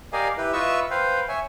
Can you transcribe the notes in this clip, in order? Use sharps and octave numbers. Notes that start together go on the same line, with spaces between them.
G4 A#4 D5 D#5 F5 G#5
E4 G4 B4
F4 B4 D#5 E5 C#6 E6
B4 C5 F5 G5
C#5 E5 G#5